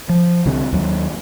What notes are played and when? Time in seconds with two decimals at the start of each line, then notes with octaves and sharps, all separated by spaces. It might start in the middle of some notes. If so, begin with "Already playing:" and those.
0.09 F3
0.46 C2 D3 C4
0.72 D#2 F#3